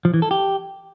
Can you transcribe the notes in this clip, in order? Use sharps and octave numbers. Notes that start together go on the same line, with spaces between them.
F3
E3
A4
G4